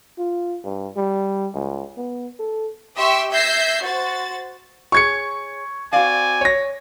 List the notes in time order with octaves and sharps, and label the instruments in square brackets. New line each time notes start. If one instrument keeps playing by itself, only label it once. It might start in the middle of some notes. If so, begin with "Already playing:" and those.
[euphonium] F4
G2
G3
C#2
B3
A4
[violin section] G4 E5 G5 C6 C#6
E5 G6 G#6 A#6 C7
F#4 C5 A6
[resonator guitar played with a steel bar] G#4 C#5 [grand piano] C#6 G#6 C#7
[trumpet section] C4 D5 G#5 [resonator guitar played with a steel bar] F#4 F5
[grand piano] C#5 A#6